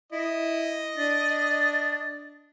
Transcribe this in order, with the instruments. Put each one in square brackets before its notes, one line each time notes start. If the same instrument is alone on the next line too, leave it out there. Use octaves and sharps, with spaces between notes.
[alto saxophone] E4 [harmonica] D#5
[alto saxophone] D4 [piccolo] A6